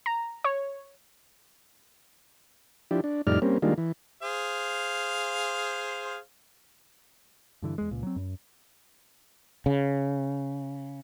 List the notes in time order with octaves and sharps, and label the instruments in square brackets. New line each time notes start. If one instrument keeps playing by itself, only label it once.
[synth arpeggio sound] A#5
C#5
[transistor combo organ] F3 D4 E4 G4
D4
F2 A2 G3 D#4 D5 F6
G3 A#3 C4 C#4
D#3 G3 G#3 A#3 D4 F4
E3
[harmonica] G#4 C5 F5
[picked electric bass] G2 D3 E3
E2 G#3
C#2 A#2
F#3 C4
F#2
[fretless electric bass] C#3